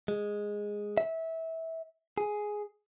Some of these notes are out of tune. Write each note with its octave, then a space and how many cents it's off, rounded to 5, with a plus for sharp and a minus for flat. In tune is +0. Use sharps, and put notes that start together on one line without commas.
G#3 -5
E5 -20
G#4 +5